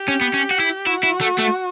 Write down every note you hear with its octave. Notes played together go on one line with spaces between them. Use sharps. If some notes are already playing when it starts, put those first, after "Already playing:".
Already playing: G4
C#4
B3
C#4
F#4
E4
E4 F#4
E4
A3
A3